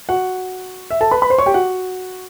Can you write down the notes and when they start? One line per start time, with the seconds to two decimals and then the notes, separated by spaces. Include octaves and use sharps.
0.09 F#4 F#5
0.91 E5
1.01 A4 A5
1.11 B4 B5
1.22 B4 B5
1.30 C5 C6
1.38 C#5 C#6
1.46 G4 G5
1.54 F#4 F#5